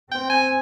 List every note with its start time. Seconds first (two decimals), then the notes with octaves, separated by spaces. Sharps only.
0.10 C4 G5
0.30 G#5